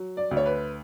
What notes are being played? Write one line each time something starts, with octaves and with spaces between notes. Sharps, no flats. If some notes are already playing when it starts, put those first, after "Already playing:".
Already playing: F#3
D5
D2
C#5
B4